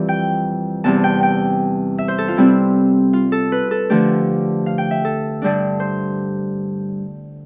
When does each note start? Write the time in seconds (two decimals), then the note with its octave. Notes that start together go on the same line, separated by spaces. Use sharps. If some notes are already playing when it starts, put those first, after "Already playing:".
Already playing: F2 E3 G3 F4 G4 D5
0.09 G5
0.84 E2 C3 G3 A5
1.04 G5
1.23 G5
1.98 E5
2.08 C5
2.18 A4
2.28 F4
2.37 C3 G3 C4 E4
3.13 F4
3.32 A4
3.52 B4
3.71 A4
3.89 D3 F3 A3 D4 G4
4.66 F5
4.78 G5
4.91 E5
5.05 A4
5.42 G2 D3 G3 D4
5.80 C5